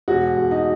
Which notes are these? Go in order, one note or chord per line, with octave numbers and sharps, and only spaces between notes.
E1 F#4
E1
D#4